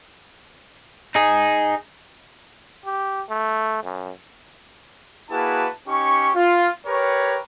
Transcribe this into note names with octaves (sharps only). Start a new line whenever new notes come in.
D#4 G#4
G4
A3
F#2
A#3 E4 F#4 G#4 B4 A5
C#4 D#4 G4 C#6
F4
G4 A#4 B4 C#5